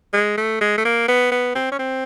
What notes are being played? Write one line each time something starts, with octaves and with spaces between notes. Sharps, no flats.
G#3
A3
G#3
A3
A#3
B3
B3
C4
C#4
C4